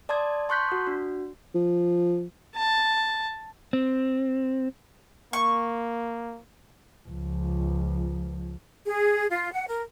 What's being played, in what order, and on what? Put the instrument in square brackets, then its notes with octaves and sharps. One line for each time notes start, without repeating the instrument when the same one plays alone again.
[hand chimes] D5 A5 C6 D#6 G#6
A5 C6 C#6 F#6 G6 B6
F#4 D#6
D4 F#4
[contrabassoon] F3
[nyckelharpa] A5
[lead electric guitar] C4
[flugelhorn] A#3 [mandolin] C#6
[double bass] C#2 F3
[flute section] G#4
F4
F#5
A#4